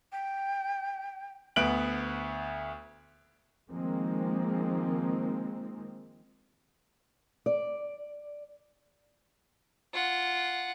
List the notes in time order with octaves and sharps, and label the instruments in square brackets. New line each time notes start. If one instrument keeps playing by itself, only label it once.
[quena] G5
[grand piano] D2 B3 F#6 D7 F#7
[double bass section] D#3 F3 G#3 A#3 C4
[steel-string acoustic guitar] D5
[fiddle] F4 F#5